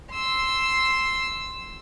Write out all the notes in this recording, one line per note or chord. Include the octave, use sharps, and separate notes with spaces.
C6 E6